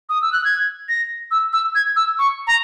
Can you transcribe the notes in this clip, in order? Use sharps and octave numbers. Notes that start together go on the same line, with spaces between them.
D#6
E6
F#6
G#6
A#6
E6
E6
G#6
E6
C#6
A#5